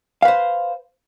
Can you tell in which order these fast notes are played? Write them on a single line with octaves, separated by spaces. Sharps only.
F5 B4 C5